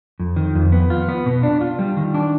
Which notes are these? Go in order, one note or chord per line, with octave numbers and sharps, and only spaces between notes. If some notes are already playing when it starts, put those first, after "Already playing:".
F2
D#3
F2
B3
F4
B3
B2
D4
F4
G3
D#3
D4